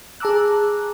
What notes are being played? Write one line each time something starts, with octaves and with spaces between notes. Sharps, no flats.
G#4 A5 A#5 D6 E6 F#6